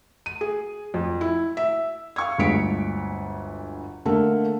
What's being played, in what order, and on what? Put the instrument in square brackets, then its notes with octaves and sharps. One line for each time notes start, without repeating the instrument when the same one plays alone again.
[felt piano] D#7
G#4
F2
E4
E5
F5 C#6 G#6
G1 D2 G#3 B6 C#7 D7
D3 A3 A#3